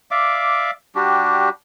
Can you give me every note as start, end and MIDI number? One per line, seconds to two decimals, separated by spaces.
0.11 0.71 74
0.11 0.71 76
0.11 0.71 77
0.11 0.71 86
0.95 1.49 55
0.95 1.49 62
0.95 1.49 66
0.95 1.49 67